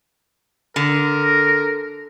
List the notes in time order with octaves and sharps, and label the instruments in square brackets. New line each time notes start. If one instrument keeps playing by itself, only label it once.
[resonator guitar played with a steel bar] D3 [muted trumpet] A#4